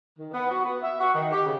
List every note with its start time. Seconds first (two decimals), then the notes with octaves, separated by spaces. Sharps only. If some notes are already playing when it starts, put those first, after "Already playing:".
0.19 D#3
0.33 B3
0.50 F#4
0.64 B3
0.82 E5
1.00 F#4
1.14 D#3
1.32 G4
1.46 C#3